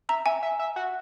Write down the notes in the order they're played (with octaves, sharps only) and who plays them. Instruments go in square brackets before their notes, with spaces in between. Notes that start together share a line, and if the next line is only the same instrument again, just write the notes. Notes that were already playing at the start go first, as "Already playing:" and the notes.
[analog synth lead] E5 [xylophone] A#5
[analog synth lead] E5 [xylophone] G#5
[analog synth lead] E5
E5
F#4